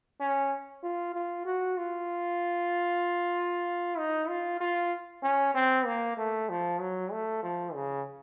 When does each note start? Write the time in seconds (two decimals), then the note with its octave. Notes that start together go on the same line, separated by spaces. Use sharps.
0.21 C#4
0.83 F4
1.14 F4
1.45 F#4
1.77 F4
3.98 D#4
4.29 F4
4.60 F4
5.23 C#4
5.55 C4
5.86 A#3
6.17 A3
6.49 F3
6.80 F#3
7.12 A3
7.43 F3
7.74 C#3